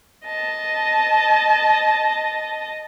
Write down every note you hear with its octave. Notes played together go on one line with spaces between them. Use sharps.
D#5 A5